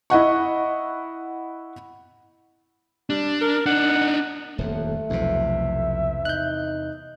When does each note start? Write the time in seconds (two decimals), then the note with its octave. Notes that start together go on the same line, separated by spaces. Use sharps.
0.10 E4 D#5 F#5 C#6
3.10 G3 D4
3.41 A#4
3.66 D4 D#4 F#5
4.58 D#1 F2 A3
5.10 B1 E2 C3 F3 E5
6.25 D#4 F#6 G6